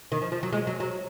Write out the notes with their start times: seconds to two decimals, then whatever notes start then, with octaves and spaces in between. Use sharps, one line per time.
0.12 D#3
0.22 F3
0.32 F3
0.43 F#3
0.53 G#3
0.67 F#3
0.80 F#3